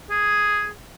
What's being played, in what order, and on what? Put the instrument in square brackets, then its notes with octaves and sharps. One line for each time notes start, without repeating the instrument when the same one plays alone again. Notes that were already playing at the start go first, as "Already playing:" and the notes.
[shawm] G#4